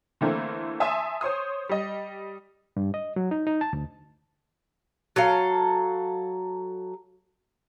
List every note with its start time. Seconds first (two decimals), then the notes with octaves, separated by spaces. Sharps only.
0.21 D3 E3 A3 A#3 C4
0.80 E5 G#5 A5 C6 D#6 E6
1.21 C5 C#5 C6 D#6
1.69 G3 D#5
2.77 G2
2.94 D#5
3.16 F#3
3.31 D#4
3.47 D#4
3.61 A5
3.73 D2
5.16 F#3 A4 F5